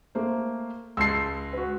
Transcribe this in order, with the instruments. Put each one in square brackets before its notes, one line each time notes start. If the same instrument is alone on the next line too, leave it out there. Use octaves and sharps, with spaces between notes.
[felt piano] A3 A#3 C5
[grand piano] C#2 C7 [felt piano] A5 C6 E6
[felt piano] F#4 B4